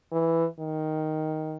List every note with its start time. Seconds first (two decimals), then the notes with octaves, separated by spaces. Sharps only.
0.12 E3
0.59 D#3